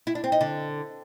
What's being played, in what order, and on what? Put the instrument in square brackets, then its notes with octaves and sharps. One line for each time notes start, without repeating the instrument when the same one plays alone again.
[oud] E4
D4
C4
D#4
D3